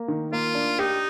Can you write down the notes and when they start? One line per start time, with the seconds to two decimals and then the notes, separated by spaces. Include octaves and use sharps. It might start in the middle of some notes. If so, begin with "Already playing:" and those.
Already playing: A#3
0.08 D#3
0.32 A#3 F4
0.55 D4
0.79 D#4 G4